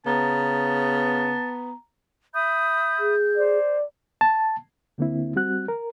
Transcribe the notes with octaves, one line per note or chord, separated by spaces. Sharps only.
C#3 B3 A5 A#5
E5 B5 D#6 G6
G#4
C5 D5
A5
D2 D3 A#3 C4 E4
G3 C4 F#4 F#6
A#4